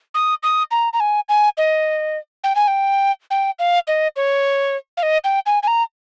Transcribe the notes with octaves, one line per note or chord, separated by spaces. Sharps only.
D#6
D#6
A#5
A#5
G#5
G#5
D#5
G5
G#5
G5
G5
F5
D#5
C#5
F5
D#5
G5
G#5
G#5
A#5